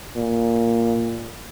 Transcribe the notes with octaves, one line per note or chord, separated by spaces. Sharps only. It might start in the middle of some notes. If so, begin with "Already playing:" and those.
A#2